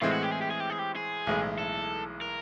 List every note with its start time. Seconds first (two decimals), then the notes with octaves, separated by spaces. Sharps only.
0.01 A2 E3 G#3 C4 F4
0.12 F#4
0.23 G4
0.32 G#4
0.42 G4
0.51 G#4
0.60 G4
0.70 G#4
0.79 G4
0.96 G#4
1.27 B1 A2 E3 G#3
1.59 A4
2.21 A#4